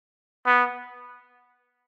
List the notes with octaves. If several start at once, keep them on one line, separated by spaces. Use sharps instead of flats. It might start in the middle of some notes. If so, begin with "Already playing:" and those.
B3